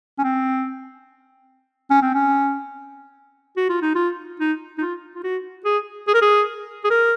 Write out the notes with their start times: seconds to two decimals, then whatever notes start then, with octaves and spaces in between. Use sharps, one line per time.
0.19 C#4
0.24 C4
1.90 C#4
2.02 C4
2.15 C#4
3.57 F#4
3.69 F4
3.82 D#4
3.95 F4
4.40 D#4
4.78 D#4
4.81 F4
5.15 F4
5.24 F#4
5.65 G#4
6.08 G#4
6.14 A#4
6.22 G#4
6.84 G#4
6.90 A#4